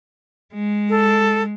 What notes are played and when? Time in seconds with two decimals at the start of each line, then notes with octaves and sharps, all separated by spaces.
0.54 G#3
0.90 A4